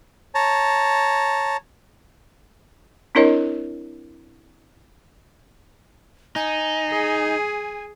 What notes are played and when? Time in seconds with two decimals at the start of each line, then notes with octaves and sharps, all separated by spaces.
0.35 C#5 A5 A#5
3.15 C4 D4 E4 A#4 C#5 D#5
6.36 D#4 G#5
6.89 G#4